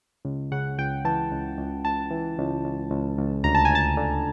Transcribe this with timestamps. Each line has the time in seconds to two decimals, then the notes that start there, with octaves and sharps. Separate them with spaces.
0.25 C#2
0.52 C#3 F#5
0.78 C#2 G5
1.05 E3 A5
1.31 C#2
1.58 C#2
1.85 C#2 A5
2.11 E3
2.38 C#2
2.65 C#2
2.90 C#2
3.18 C#2
3.44 D2 A#5
3.55 A5
3.65 G#5
3.70 D2 A5
3.97 D3